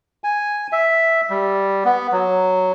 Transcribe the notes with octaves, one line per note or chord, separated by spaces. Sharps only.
G#5
E5
G3
B3
F#3